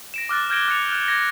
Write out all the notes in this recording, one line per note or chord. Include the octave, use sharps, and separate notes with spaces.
A#6 D7 E7
D6 F6 F#6 A6
F6 G6 G#6 A#6 D7 G7
F#6 A6 C#7 F7
F6 F#6
G#6 A#6